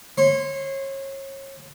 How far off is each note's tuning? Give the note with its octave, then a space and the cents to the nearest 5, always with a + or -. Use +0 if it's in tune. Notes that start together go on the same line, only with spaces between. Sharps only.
C#5 -30 C6 -10